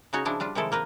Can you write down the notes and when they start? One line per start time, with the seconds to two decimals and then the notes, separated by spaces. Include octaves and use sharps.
0.13 C#3 C#4 D#4 F#4 C#5
0.25 C#3 F3 D4 E4
0.40 G3 D4 F4
0.55 C3 D#3 F3 G#3 E4 A4
0.72 A#3 A#4 B4